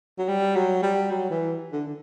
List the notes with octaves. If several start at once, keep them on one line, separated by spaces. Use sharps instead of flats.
F#3
G3
F#3
G3
F#3
E3
D3
D3